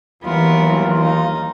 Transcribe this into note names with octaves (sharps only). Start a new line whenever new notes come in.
D#2 E3 F#3 G3 B3 F4 A#4
D#4